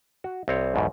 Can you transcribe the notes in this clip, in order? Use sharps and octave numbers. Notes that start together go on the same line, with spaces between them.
F#4
C2 C4 C#5
B1 E2 G#2 B2